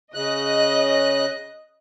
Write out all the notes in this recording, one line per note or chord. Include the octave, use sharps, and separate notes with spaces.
C#3 D#5 F#6